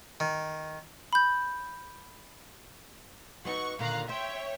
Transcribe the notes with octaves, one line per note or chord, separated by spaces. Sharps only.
D#3
B5 G6
F#3 B3 D#4 F#5 C#6
A#2 D3 D#3 F5 A#5 F#6
C5 C#5 E5 G5